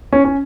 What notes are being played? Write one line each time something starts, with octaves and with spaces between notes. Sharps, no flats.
C#4
C#4